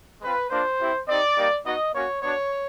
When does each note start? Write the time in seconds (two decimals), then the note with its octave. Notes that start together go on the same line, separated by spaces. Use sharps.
0.21 G#3 C4 F4 B4
0.50 A#3 D4 F4 C5
0.79 C4 E4 G4
1.08 C4 D#4 G4 D5
1.37 G3 A#3 D#4 G4
1.65 B3 D#4 F#4 D#5
1.94 A#3 C#4 F#4 C#5
2.22 B3 D4 F#4 C#5